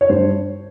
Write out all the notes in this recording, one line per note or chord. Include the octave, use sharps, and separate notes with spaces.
C#5
G2 C5